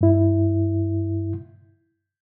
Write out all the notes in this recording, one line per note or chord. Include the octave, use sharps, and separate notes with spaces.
G2 E4